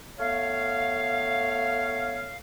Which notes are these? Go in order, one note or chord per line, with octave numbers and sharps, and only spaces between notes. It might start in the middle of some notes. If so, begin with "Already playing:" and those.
A3 B3 C#5 F5